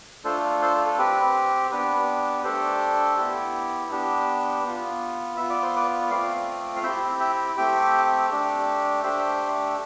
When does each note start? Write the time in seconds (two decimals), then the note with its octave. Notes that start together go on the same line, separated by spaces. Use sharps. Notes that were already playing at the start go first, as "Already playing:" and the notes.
0.24 A3 D4 F4 A4 C5
0.62 A4 C5
0.86 A4
0.98 C4 G4 B4
1.71 B3 D4 G4 B4
2.39 B4
2.44 A3 D4 G4 A4 C5
3.17 B3 E4 G4
3.91 B3 D4 G4
4.64 B3 F4
5.37 B3 F4 E5
5.50 D5
5.62 C5
5.76 B4 D5
6.11 A3 C4 F4 D5 F5
6.76 F5
6.83 C4 E4 G4 E5 G5
7.20 E5 G5
7.57 A3 C4 G4 E5 G5
8.30 A3 D4 G4
9.03 A3 D4 G4 C5 E5